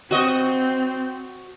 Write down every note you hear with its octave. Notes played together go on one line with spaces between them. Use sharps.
C4 F#4 D#5